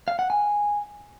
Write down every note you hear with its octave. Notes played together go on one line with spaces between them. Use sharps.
F5
F#5
G#5